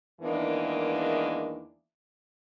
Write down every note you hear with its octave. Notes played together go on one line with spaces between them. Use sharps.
E2 D#3 E3 G#3 A#3 D4